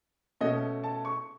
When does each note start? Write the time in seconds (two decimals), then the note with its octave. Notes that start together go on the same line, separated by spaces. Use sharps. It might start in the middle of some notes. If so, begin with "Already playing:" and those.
0.41 B2 A3 C#4 D#5
0.84 A5
1.05 C#6